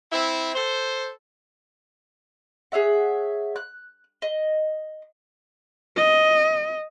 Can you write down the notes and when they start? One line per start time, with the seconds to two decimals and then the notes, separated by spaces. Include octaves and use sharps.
0.12 C4 E4
0.55 A4 C5
2.72 G#4 C#5 E5 F#5
3.56 F#6
4.22 D#5
5.97 D#5